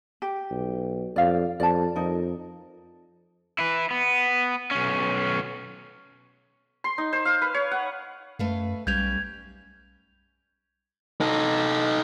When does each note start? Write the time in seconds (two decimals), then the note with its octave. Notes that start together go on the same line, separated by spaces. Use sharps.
0.22 G4
0.51 B1
1.16 F2 D5 F5
1.60 F2 D5 A5
1.96 F2 D#4 A#4
3.59 E4 B4
3.91 B3
4.71 B1 C#4
6.84 C6
6.98 D#4
7.13 C5
7.25 F5
7.42 B4
7.54 C#5
7.71 F#5
8.39 F#2 A3 B4 F5
8.87 B1 G3 C#4 G4 G6 G#6 F7
11.21 D#4 A4